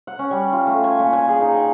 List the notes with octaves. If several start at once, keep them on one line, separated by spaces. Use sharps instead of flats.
F#5
C#4
G3
F4
A3
G#5
A#2
G#5
G#4
D#4
G5